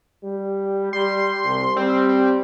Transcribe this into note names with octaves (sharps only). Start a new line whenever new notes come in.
G3
G3 C6
C2
G3 C4
C4